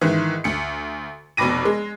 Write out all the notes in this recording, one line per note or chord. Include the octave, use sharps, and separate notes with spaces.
G#2 D#3 E3
D2 C#7
F1 B2 B5 D6 A#6 D#7
G#3